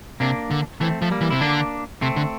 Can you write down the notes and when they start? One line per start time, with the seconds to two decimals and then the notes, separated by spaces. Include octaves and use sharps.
0.20 C3 A#3 D4
0.51 D3
0.80 E3 A3 C4
1.02 F3 A3
1.11 G3 A#3
1.21 E3
1.30 C3 E4
1.41 D3 A#3 D4
2.01 C3 A3 C4
2.16 D3